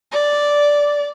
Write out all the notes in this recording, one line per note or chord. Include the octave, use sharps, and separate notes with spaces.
D5